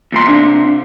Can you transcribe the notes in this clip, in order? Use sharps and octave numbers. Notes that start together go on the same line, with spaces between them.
E2 A#2 C6
C3 D4